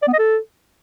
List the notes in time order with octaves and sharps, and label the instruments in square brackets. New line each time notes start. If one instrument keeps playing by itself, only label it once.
[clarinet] D5
B3
D#5
A4